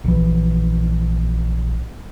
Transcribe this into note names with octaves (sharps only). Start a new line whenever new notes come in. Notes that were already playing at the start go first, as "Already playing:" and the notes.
A#1 E3